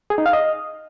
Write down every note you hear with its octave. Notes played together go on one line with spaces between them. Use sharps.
G#4
D#4
F5
D#5